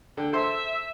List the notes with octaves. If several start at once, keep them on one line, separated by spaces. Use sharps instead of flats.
D3 G5
A4 C5 E5 C6